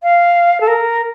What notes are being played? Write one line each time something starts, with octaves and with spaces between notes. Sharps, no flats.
F5
A4
A#4